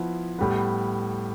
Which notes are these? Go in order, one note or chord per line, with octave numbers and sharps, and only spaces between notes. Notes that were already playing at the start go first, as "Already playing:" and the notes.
Already playing: F3 B3 E4
A2 G3 B3